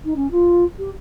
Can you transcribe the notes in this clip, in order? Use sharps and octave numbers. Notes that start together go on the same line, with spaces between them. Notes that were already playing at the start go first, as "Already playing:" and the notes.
D#4
C#4
F4
G4